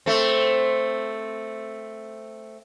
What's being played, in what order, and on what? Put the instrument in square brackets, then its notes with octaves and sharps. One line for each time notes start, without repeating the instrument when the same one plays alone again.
[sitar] A3 C4